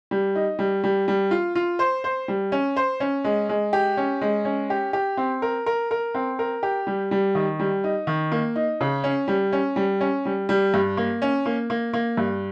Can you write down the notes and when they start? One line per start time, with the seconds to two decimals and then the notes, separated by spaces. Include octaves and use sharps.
0.11 G3
0.35 D#4
0.59 G3
0.84 G3
1.08 G3
1.31 F4
1.55 F4
1.79 C5
2.04 C5
2.28 G3
2.52 C#4
2.76 C5
3.00 C#4
3.24 G#3
3.49 G#3
3.73 G4
3.97 C#4
4.21 G#3
4.45 C#4
4.70 G4
4.93 G4
5.17 C4
5.42 A#4
5.66 A#4
5.91 A#4
6.15 C4
6.39 A#4
6.63 G4
6.87 G3
7.11 G3
7.35 D#3
7.59 G3
7.84 D#4
8.07 D#3
8.32 A#3
8.56 D#4
8.81 C#3
9.04 C#4
9.28 G3
9.53 C#4
9.76 G3
10.01 C#4
10.25 G3
10.49 G3
10.74 G2
10.97 A#3
11.22 C#4
11.46 A#3
11.70 A#3
11.93 A#3
12.17 G2